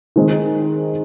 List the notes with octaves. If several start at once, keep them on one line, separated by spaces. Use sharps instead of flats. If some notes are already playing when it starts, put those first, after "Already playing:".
D#3 G#3 C4